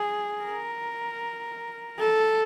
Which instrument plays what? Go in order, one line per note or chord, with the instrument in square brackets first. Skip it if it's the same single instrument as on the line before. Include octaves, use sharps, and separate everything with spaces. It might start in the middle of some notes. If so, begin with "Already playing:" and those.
Already playing: [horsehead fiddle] G#4
A#4
A4